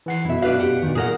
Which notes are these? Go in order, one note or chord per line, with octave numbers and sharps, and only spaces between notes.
E3 F#5 C7
F#2 B2 E4 E5
D4 F#4 B4 F5
G4 F#5
A#2 D#3
A#2 G#4 A#4 F#5